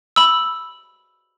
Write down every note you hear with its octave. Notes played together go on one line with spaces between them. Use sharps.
B5 E6